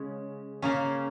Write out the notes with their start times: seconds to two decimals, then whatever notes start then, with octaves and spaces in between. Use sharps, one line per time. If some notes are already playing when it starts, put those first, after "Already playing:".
Already playing: C#3 G#3 C#4
0.62 C#3 A#3 C#4